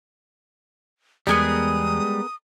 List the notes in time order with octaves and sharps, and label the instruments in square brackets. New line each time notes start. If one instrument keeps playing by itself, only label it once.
[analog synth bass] E2 [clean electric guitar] G3 G#3 [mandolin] B3 G#4 A#4 [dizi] D#6